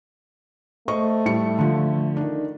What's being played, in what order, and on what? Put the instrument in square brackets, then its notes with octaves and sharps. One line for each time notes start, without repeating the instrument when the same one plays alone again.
[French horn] A3 [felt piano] C5 D#5 C#6
[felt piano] A2 G3 C#7
D3 F3
D#3 D4